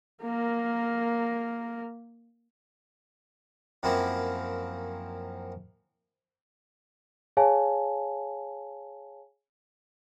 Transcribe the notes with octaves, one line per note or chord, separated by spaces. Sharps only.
A#3 A#4
F#2 F3 A#3 C4 E4
G#4 C#5 F5 G#5 A5